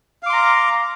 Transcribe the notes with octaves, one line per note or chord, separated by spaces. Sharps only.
F5 A#5 C6 D6